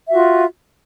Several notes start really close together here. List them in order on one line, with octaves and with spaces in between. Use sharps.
E5 F#4 F4